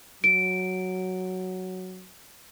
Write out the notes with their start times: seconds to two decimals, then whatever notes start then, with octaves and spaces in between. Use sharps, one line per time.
0.24 F#3 D7